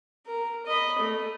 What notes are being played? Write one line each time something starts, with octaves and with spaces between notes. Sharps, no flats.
A#4
D#5 B5
A3